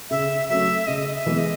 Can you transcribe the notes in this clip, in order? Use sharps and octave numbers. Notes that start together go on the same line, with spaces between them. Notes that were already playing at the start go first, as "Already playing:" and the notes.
C#3 E5
F#3 A3 C#4 E5
C#3 D#5
D#5
E5
E3 G#3 B3
D#5